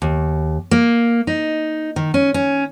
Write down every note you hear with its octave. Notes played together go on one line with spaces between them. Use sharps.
D#2
A#3
D#4
D#3
C#4
C#4